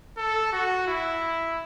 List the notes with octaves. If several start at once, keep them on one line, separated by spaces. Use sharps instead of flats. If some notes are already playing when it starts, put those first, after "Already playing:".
A4
F#4
E4